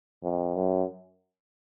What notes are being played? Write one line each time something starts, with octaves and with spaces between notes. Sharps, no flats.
F2
F#2